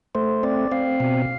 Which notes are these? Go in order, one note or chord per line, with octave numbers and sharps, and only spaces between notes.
A3 C5
C4 D5
C4 F5
B2